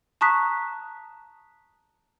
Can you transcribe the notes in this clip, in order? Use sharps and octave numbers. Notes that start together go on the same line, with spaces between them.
A5 A#5 C#6 D#6 F#6 B6